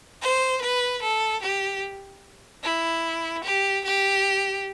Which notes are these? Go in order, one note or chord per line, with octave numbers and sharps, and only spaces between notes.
C5
B4
A4
G4
E4
G4
G4